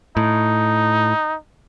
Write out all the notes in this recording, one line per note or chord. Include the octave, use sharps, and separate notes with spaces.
A2 D#4